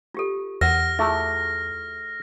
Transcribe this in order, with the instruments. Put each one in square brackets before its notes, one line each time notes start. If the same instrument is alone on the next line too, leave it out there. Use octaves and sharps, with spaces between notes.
[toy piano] F4 G4 A4
[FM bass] E2 [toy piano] A#4 F#5 [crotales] F6 A#6
[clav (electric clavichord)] A3 [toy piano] E4 F4 G#4